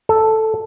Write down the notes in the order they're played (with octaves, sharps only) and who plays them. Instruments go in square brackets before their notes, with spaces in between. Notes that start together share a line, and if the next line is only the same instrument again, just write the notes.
[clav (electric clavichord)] A4